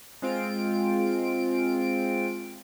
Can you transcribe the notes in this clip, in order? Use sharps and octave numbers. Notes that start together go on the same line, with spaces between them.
G#3 C4 F4 D7